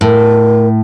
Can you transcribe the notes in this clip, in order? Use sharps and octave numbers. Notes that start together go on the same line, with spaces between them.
A2 A#4